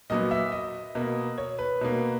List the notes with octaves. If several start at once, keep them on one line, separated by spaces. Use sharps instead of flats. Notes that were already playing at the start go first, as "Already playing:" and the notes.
A#2 F#3 B3 D#5
E5
D#5
B2 A#3
C#5
B4
B2 A#3